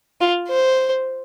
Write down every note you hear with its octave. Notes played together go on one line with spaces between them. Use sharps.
F4
C5